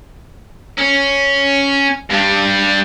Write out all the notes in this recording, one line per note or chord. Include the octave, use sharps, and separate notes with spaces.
C#4
G2 G3